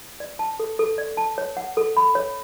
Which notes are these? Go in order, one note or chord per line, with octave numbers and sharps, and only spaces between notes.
D5
A5
A4
A4
D5
A5
C#5
F#5
A4
B5
C#5